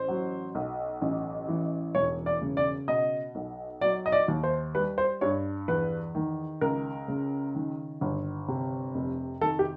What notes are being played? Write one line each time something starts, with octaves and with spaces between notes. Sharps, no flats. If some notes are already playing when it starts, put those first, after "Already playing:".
Already playing: A1 C5
F#3
B1
A1
E3
E1 C#5
D5
C#3
D5
B2 D#5
B1
F#3 D5
D#5
D5
D#2
C5
G3 B4
C5
G2 C#5
E2 B4
D#3
C#2 A#4
C#3
D#3
G1
C3
F1
D#3 A4
G4